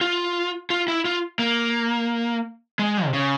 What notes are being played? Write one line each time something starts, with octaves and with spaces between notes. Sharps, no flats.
F4
F4
E4
F4
A#3
G#3
C3
C#3